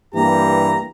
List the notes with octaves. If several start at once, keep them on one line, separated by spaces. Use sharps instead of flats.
G2 E3 A#3 G4 A#5